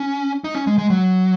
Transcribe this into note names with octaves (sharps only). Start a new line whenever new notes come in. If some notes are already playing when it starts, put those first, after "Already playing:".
Already playing: C#4
D#4
C#4
G#3
G#3
F#3